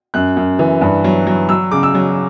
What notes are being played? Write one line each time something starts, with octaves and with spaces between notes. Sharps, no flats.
F#2 F#6
F#2
E3
G2
F#3
F#3
F#3 E6
C#3 D6
E6
F#3